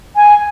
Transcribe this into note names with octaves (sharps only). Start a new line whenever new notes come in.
G#5